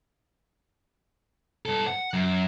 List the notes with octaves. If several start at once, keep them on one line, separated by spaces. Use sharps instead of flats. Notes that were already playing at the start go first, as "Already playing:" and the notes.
G2 A4
F#5
F#2